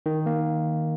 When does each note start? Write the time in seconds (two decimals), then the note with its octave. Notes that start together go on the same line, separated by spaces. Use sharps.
0.06 D#3
0.26 A#3